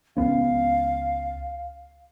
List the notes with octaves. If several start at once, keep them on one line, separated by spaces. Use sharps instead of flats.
C#2 B3 C#4 F5